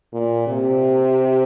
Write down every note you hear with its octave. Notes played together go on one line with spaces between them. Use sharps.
A#2
C3